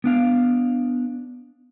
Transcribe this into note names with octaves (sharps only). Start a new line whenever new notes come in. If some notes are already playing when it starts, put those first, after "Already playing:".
B3 D4 F5